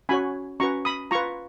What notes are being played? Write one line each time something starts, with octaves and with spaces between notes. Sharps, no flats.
C#4 F#4 C#5 G#5 B5
C#4 F#4 B4 A#5 C#6
B5 D#6
F4 B4 A#5 C#6